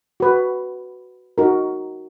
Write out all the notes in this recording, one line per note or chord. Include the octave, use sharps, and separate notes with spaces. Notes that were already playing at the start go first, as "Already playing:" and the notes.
F#4 B4
D#4 F#4 A#4